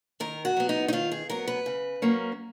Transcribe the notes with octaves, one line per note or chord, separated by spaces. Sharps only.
D#3 A#4
F#4
F#3 B3
D#4
D#4
D#3 F4
G#4
F#3 B3 A#4
B4
C#3
F#3 A#3 C#4